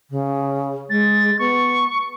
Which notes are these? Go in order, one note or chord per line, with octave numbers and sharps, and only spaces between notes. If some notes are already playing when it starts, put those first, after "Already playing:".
C#3
G#3 A6
B3 C#6